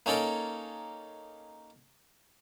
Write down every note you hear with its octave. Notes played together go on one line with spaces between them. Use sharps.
A#3 C#4 D#4 A4 A#4